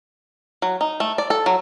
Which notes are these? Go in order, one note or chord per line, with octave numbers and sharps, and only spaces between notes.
F#3
D#4
A3
D5
A4
F#3